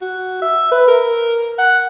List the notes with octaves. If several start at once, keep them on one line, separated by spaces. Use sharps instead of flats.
F#4
E5
B4
A#4
F#5